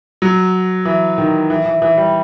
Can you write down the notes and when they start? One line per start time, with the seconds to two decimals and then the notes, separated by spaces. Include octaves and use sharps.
0.22 F#3
0.85 E3
1.18 D#3
1.50 E3
1.66 E3
1.82 E3
1.97 G3